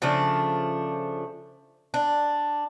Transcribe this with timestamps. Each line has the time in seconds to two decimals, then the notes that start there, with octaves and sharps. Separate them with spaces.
0.02 C#3 F3 A3 D4
1.94 D4